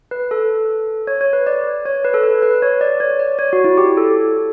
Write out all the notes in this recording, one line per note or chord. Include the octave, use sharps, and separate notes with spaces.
B4
A4
C#5
C#5
B4
D5
C#5
B4
A4
B4
B4
C#5
D5
C#5
D5
C#5
F#4
E4
G4
A4